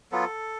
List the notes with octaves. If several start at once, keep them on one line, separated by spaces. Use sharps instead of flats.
F#3 B3 F4 A4